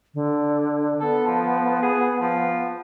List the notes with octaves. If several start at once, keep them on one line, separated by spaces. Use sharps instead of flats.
D3
B3 A4
F3
G#4
F3